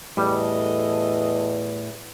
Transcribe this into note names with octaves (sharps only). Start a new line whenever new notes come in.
E2 A2 G3 A4 D#5